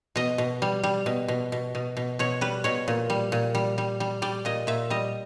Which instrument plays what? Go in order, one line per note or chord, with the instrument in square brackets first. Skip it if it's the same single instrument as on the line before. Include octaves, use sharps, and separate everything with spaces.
[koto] B2 D#5
B2
G3
G3
B2
B2
B2
B2
B2
B2 C#5
G3 B4
B2 C#5
A#2
G3
A#2
G3
G3
G3
G3 D5
A#2 D#5
A#2 E5
G3 D#5